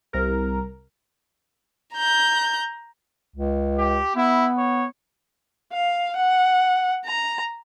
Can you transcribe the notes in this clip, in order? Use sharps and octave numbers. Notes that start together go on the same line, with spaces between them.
C2 A#4
A#5 G6
C#2
G4
B3 E4
C#5
F5
F#5
A#5